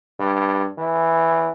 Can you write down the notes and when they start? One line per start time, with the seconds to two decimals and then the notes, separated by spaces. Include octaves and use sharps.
0.19 G2
0.78 E3